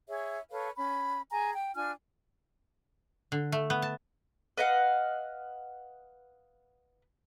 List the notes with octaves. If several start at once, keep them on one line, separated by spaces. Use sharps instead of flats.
G#4 C#5 E5
A4 B4 C#5 F5
C#4 B5
G#4 G#5 A#5
G5
D4 F4 G#5 F6
D3
A3
B3
A5
B4 D#5 F5 F#5